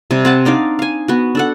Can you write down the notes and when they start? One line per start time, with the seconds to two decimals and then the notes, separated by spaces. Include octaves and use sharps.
0.11 C3 G3
0.25 C4 F#5 A5
0.45 D4 D#4 D5 F5
0.79 F5 G#5
1.08 B3 F#4
1.35 D4 A4 F#5